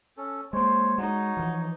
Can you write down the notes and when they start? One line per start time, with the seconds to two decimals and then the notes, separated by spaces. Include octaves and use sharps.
0.17 C#4 A4
0.53 G#3 A#3 C5 C#5
0.98 G#3 D#4 F#4
1.37 E3 F3